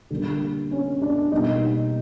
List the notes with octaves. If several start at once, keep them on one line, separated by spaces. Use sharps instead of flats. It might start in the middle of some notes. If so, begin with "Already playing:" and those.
D3 G3 A#3
C#4
D4
B2 G3 A#3 D#4